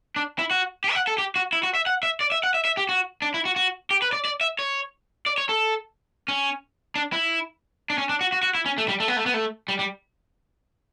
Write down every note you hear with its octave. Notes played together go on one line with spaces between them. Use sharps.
D4
E4
F#4
G4
E5
F#5
A4
G4
F#4
E4
F#4
E5
F#5
E5
D5
E5
F#5
E5
E5
G4
F#4
D4
E4
F#4
F#4
G4
B4
D5
D5
E5
C#5
D5
C#5
A4
C#4
D4
E4
D4
C#4
D4
F#4
F#4
F#4
E4
C#4
A3
G3
A3
B3
A3
B3
A3
G3
G3